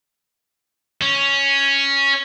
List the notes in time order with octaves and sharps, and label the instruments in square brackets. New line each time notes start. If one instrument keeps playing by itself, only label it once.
[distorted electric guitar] C#4